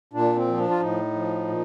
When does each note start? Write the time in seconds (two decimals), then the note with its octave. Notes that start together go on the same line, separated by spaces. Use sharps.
0.13 A#2 D4
0.36 C4
0.47 F3
0.58 D4
0.70 F4
0.80 A2 D#4
1.14 F3
1.48 A#2